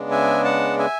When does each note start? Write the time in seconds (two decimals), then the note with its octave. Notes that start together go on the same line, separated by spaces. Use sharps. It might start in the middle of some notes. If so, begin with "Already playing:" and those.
Already playing: C#3 G#3 B3 D4
0.11 E5 G#5
0.44 F#5 A5
0.78 E5 G#5